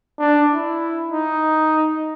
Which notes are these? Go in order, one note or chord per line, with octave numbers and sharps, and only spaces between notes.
D4
E4
D#4